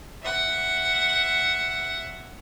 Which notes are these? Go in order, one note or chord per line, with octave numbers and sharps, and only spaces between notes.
E5 F#5